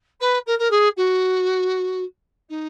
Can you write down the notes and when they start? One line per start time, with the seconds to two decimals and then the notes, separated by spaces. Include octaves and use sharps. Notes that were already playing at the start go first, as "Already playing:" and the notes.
0.20 B4
0.46 A#4
0.59 A#4
0.70 G#4
0.97 F#4
2.49 D#4